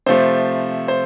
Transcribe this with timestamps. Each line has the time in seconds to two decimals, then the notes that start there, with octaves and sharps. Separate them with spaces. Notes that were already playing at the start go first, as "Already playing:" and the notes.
0.06 C3 F3 A3 C5
0.88 C5